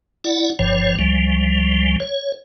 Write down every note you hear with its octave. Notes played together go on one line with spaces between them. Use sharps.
E4 D5 F#5
G1 G2 F3 C#5
C#2 F3 G3
C#5